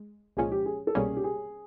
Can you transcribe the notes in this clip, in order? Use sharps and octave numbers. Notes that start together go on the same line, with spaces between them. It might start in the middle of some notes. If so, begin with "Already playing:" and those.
Already playing: G#3
C2 A#2 F3 G#3 C#4 G#4
G4
G#4
A4
C2 B2 G3 A#3 C#4 G#4
G4
G#4